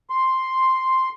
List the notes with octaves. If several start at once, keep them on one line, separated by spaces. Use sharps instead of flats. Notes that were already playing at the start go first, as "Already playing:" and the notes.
C6